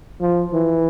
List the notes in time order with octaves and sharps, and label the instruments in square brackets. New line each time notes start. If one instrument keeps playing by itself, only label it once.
[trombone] F3
E3